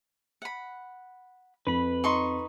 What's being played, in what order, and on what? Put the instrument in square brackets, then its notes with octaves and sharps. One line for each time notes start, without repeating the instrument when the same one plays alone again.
[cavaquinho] F#5 B5
[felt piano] F2 [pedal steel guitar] B4 B5
[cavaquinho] D#4 C6 C#6